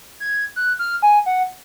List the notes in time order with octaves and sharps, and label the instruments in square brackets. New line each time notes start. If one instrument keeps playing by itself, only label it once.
[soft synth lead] G#6
F#6
F6
G#5
F#5